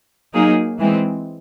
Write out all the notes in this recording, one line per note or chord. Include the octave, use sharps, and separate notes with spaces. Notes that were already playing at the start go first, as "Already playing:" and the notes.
F#3 A#3 D#4 G#4
E3 G#3 C4